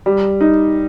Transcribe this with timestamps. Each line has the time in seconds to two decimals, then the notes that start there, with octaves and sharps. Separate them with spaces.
0.06 G3
0.41 D#4